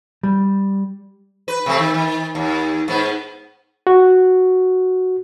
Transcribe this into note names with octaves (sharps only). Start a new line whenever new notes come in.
G3
B4
C3 A3 C4
D#3
D#3
D#2
G#2 B3
F#4